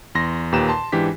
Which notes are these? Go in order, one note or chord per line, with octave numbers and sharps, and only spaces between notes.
E2 C6 A#6
D#2 A#2 G4 B4 A#5 E7
A5 C6
G#2 E3 D4 G4 B6